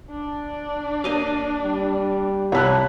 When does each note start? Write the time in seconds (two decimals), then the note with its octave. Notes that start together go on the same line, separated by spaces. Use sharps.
0.10 D4 D5
1.04 A#3 D#5 F5
1.64 G3
2.52 C2 E4 C#5 A5 F#6